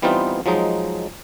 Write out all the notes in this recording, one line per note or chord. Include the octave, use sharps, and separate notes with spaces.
E3 G3 B3 C4 D#4 F4
F3 F#3 G#3 D#4